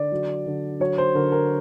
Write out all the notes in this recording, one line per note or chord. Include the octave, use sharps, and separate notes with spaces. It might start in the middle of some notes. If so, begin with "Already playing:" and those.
Already playing: D3 D5
F#3
D3
F#3 C#5
C5
D3 A#4
A#4